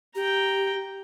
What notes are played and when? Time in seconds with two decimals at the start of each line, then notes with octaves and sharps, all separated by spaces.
0.15 G4 G5 A#5